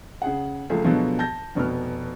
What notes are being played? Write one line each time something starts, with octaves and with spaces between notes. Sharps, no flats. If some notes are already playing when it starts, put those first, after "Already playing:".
C#3 G#4 F#5
C#2 F3 A3 G#4
B2 D3 F3 F#3 G#3 B3
A5 G6 A#6
F1 B2 B3 F6